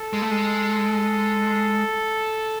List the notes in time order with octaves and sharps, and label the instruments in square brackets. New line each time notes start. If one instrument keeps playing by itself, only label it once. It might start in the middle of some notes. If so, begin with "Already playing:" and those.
Already playing: [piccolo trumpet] A4
[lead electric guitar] G#3
A3
G#3